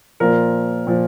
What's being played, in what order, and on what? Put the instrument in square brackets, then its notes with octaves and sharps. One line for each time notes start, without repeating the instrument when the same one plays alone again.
[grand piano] A#2 F3 A#4
A#2 F3